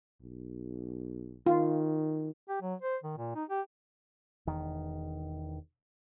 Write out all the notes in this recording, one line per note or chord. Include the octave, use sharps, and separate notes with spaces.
B1
D#3 F4
G4
F#3
C5
D#3
A#2
D#4
G4
E1 E2 D#3